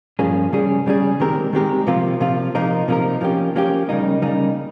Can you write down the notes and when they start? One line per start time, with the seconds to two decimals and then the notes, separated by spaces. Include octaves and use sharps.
0.19 G2 F3 A#3 C#4 G#4
0.53 C#3 G3 C#4 G#4
0.86 C#3 G3 C#4 G#4
1.20 D#3 G#3 C4 G4 A#4
1.53 D#3 G#3 C4 G4 A#4
1.87 C3 F3 A#3 F4
2.20 C3 F3 A#3 F4
2.55 C3 F3 A#3 D#4 A#4
2.88 C3 F3 A#3 D#4 A#4
3.21 F3 A#3 C#4 G4
3.56 F3 A#3 C#4 G4
3.89 C#3 G3 A#3 D#4
4.22 C#3 G3 A#3 D#4